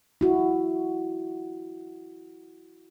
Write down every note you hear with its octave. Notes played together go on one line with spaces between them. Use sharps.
E4 F#4